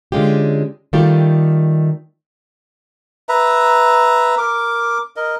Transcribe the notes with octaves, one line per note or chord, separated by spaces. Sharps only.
D3 G#3 C#4 F4 G4
D#3 G3 A3 F4 G4
B4 E5 A#5
A#4 D6
A#4 D#5